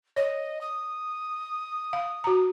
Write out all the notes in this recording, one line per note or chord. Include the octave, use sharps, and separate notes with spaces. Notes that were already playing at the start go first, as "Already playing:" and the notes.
C#5 D#5
D#6
F5
F#4 A#5